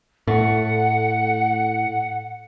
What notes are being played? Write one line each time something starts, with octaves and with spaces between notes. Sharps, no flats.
A2 A3 F#5